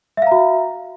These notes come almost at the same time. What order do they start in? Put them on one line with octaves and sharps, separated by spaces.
E5 F5 A#5 F#4